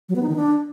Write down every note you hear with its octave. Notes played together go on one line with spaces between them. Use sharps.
F#3
B3
D#4
D#3
D4